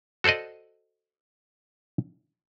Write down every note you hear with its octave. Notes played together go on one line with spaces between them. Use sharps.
F#4 A4 C5 D5 D#5